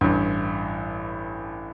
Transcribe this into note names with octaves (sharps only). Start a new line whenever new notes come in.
A1 G2